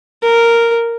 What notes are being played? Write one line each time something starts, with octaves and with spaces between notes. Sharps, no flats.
A#4